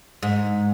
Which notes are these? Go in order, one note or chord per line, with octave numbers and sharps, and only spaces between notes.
G#2